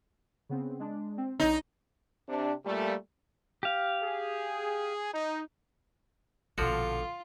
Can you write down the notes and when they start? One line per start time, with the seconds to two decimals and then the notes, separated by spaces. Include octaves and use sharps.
0.49 C#3 B3 C4
0.80 G#3 D4
1.18 C4
1.40 B1 D4 D#4 C#5
2.28 C3 D4
2.65 A#2 G3 A3
3.63 G4 F5
4.02 G#4
5.13 D#4
6.58 A#1 B2 D3 F3 F4 F#4